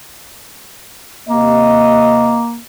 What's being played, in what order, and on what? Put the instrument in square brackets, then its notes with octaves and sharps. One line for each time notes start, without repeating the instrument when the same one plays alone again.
[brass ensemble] C3 D#5 [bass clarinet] A#3